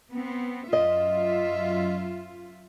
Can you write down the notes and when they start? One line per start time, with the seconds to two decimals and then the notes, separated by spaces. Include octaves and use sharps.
0.12 B3 C4
0.73 F#2 F4 D#5 E5